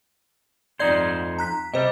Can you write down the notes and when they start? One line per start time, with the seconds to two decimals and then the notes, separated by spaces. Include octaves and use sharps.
0.79 F2 D#4 C5 D5 G#6
1.38 A#5 F#6 B6
1.74 C3 G3 C5 D#5